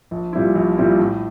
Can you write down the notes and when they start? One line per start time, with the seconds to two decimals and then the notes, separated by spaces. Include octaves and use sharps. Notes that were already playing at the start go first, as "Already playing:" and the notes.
0.11 A#1
0.33 A#2 G3 C4 E4
0.55 A#1
0.78 A#2 G3 C4 E4
1.00 A2